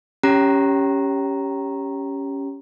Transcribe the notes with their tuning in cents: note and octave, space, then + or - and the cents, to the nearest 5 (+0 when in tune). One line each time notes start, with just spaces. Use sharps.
C#4 +5 G4 +0 A#5 +0